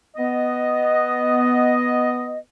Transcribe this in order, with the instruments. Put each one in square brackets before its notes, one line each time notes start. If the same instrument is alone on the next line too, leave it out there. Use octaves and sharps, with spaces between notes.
[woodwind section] B3 D#5